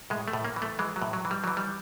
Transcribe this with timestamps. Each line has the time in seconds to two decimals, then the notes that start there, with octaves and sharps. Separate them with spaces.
0.10 A2 G#3
0.28 A3
0.33 A2
0.45 A#3
0.56 E3
0.62 A3
0.79 E3 G#3
0.96 F#3
1.02 A2
1.13 F#3
1.25 E3
1.31 G3
1.44 E3 F#3
1.57 G3